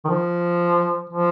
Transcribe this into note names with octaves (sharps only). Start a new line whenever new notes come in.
D#3
F3
F3